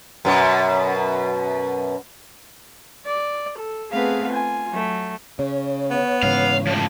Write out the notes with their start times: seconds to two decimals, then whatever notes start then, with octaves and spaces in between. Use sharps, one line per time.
0.25 F#2 B2
3.05 D5
3.58 A4
3.91 A3 B3 C4 G#4 B4 F5
4.31 F4 G#5
4.69 F#3 A3
5.39 C#3 C#5
5.91 B3
6.23 G#2 C#3 E3 F5
6.67 F3 A3